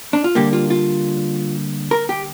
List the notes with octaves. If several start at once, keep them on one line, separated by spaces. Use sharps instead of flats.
D4
F4
D3 G3 A#3 G4
F4
F4
A#4
G4